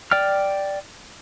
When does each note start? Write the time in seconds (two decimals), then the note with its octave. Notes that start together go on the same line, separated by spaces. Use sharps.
0.11 D5 G5 F6